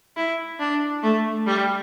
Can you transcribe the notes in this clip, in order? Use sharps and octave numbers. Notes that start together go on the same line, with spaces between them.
E4
D4
A3
G3